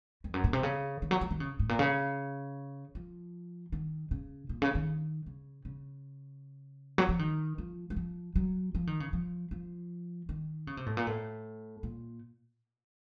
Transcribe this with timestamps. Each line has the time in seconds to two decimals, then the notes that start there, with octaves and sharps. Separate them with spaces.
0.24 F2
0.34 F#2
0.44 A#2
0.53 C3
0.63 C#3
1.02 D#3
1.11 F#3
1.21 F3
1.30 D#3
1.40 C#3
1.59 A2
1.69 A#2
1.79 C#3
2.95 F3
3.72 D#3
4.11 C#3
4.49 A#2
4.62 C#3
4.75 D#3
5.26 C#3
5.65 C#3
6.98 F#3
7.09 F3
7.19 D#3
7.58 F3
7.90 F#3
7.96 F3
8.36 F#3
8.75 F3
8.87 D#3
9.00 C#3
9.13 F3
9.51 F3
10.29 D#3
10.67 C#3
10.77 C3
10.86 A2
10.97 A#2
11.07 A2
11.83 A#2